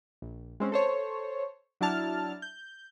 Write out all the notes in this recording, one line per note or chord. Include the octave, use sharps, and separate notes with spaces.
A#1
G#3 C4 C#4
A4 C5 C#5
F#3 D4 E4 A5 F6
G6